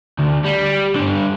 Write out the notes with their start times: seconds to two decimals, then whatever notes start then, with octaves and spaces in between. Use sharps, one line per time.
0.19 D2
0.45 G3
0.96 G2 D3